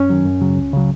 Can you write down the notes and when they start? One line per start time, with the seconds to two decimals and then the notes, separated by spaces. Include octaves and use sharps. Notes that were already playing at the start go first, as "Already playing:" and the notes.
Already playing: F#2 C#4
0.10 D#3 F#3
0.25 F#2
0.41 C#3 F#3
0.57 C#2
0.73 C#3 F#3